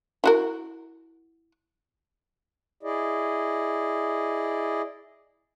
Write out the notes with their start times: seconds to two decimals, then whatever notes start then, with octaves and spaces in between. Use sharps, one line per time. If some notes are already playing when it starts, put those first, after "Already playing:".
0.24 E4 F#4 A#4
2.83 E4 G#4 D5 D#5